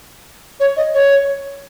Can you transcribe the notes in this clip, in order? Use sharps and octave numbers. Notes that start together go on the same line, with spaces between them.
C#5
D#5
C#5